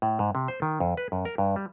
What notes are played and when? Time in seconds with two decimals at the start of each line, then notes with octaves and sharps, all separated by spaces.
0.02 A2
0.19 G#2
0.35 C3
0.48 C5
0.62 D#3
0.80 F2
0.97 B4
1.12 F#2
1.25 A#4
1.38 G2
1.56 G3